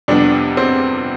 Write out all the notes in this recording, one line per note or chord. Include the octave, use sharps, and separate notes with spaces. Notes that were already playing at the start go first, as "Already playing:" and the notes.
F2 C3 G3 B3 D4
C4